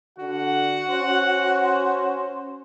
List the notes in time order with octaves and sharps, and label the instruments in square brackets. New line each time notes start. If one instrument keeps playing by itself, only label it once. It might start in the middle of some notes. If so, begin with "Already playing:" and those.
[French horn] D3 [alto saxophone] F#4 [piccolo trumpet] F#5
[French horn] C#4 [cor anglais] C5